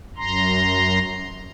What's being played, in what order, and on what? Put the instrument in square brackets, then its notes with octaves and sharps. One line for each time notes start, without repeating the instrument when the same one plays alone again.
[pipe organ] F#2 A#5 C6